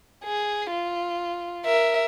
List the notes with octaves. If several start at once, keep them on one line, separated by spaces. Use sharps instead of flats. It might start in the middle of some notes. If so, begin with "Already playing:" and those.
G#4
F4
A#4 E5